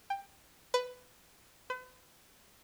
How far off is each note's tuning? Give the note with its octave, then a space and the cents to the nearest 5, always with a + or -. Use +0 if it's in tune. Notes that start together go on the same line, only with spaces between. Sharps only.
G5 +15
B4 +15
B4 +45